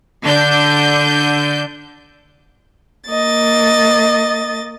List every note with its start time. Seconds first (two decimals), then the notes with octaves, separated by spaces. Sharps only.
0.22 D3 D4 G6
3.09 A#3 D#5 A6